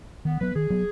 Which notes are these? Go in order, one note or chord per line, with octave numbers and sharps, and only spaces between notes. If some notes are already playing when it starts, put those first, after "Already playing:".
D#3 B3
F#3 B3 B4
D#3 G#4
F#3 B3